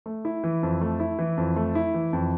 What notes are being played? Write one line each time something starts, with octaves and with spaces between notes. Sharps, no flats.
A3
E4
E3
F2
A3
E4
E3
F2
A3
E4
E3
F2